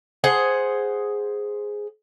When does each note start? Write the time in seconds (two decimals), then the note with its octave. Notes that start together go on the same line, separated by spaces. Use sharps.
0.24 G#4 C5 F#5